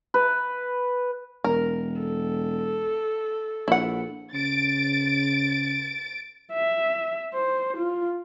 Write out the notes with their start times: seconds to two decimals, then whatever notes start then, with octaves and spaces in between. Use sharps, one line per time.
0.14 B4
1.44 E1 A#4
1.98 A4
3.68 A#1 E4 F#5
4.34 C#3 A6 D7
6.53 E5
7.34 C5
7.78 F4